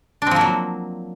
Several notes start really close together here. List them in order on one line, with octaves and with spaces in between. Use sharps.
D4 C4 F3 A#3 F#3